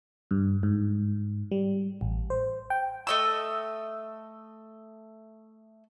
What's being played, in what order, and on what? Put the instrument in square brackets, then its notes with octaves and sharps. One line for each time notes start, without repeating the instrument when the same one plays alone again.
[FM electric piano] G2
G#2
G3
A1
C5
G5
[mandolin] A3 D#5 E6